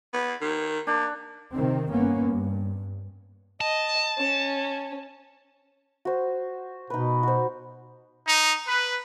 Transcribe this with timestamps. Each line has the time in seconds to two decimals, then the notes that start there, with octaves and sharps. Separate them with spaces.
0.13 B3
0.41 D#3
0.87 A#3 D4
1.52 C3 D#3 C4
1.89 G1 A#3 B3 C#4
2.29 G2
3.61 D#5 A5
4.17 C#4
6.05 F#4 C5
6.90 B2 D#4 B4
7.23 F#4 C5
8.27 D#4
8.68 B4